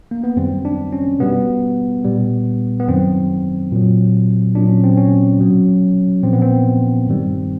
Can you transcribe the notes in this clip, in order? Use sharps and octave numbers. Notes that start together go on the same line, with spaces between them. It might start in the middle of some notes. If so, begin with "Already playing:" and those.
A#3
B3
F#2 D#3 G3 C4
D4
C#4
B2 G3 B3
A#2 G3
B3
F#2 D#3 F#3 C4
A#2 F#3
A#2 F#3 D4
C#4
C4
C#4
B2 F#3
A#2 F3 C4
B3
C4
G2 D#3 G3